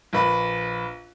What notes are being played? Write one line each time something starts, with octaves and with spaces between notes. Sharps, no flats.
A#1 B4 B5